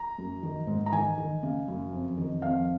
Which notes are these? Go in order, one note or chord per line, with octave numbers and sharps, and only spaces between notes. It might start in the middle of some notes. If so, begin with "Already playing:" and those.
Already playing: A#5
F#2
D#3
G#2
A#5
D#3 G#5
D#3
C#3
F#2
F2
D#3
F2 F5